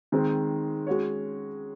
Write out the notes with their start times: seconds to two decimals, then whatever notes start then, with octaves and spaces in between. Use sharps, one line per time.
0.12 D#3 G#3 C4
0.87 G#3 C#4 F#4 C#5